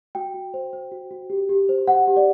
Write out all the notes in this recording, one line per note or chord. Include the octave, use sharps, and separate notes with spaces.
F#4 G5
F#4
C5
C5
F#4
F#4
G4
G4
C5
C5 F#5
G4
D5